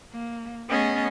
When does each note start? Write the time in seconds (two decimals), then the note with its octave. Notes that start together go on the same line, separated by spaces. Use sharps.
0.12 A#3
0.69 A3 B3 C#4 G#4 D#5